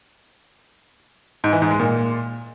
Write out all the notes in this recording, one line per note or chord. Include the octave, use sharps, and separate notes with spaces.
G#2
E3
G#2
G#3
A#2